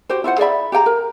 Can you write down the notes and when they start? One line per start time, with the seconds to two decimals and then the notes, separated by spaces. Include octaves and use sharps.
0.09 F#4 G4 C5
0.24 E4 F4 C5 F#5
0.38 G#4 D5 E5 B5
0.72 G4 G#4 G5 A#5
0.86 A#4